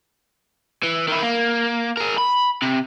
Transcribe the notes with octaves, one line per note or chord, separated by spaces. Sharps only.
E3
D#3 E4
A#3
G#4 A#4
B5
C3